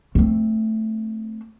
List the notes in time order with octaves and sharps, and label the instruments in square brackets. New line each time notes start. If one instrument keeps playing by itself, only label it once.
[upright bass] A3 C4